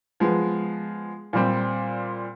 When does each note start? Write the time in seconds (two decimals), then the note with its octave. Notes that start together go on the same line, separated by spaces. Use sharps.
0.20 F3 G#3 B3
1.33 A#2 G3 C4